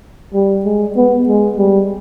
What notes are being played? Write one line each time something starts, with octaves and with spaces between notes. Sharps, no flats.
G3
G#3
B3
G#3
G3